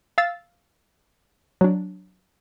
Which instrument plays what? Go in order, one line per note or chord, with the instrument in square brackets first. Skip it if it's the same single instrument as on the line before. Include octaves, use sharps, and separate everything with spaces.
[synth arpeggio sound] F5 E6 A6
F#3 D4